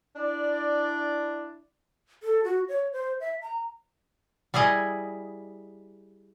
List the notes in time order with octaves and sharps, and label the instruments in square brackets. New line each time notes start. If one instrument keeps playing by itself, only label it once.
[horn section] D4 E4 D5
[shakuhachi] A4
F#4
C#5
C5
E5
A#5
[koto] G3 E4 G#4 D#5